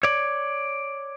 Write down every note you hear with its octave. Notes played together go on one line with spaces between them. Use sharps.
C#5 D5